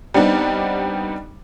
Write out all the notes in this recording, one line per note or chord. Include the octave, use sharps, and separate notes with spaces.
G3 B3 C4 D4 D#4